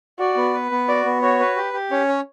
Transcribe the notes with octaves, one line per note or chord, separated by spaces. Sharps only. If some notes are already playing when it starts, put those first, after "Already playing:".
F#4 D5
B3
B4
B3
F#4 D5
B3
F#4 C#5
B4
G4
G4
C#4 C#5
C#5